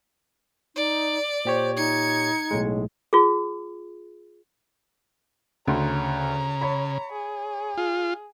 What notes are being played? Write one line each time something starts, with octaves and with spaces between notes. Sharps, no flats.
D#4 D5
A#2 G4 C5 C#5
D#4 G#6 C#7
B1 A2 G#3
F4 G#4
D2 C#3 A#5 C6
C#5 B5
G#4
F4